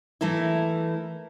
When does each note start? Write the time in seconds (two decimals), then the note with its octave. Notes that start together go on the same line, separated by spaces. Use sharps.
0.21 E3 A3 A#3 E4